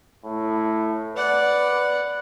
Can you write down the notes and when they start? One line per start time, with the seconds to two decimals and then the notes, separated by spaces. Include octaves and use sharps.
0.25 A2
1.16 B4 D5 F#5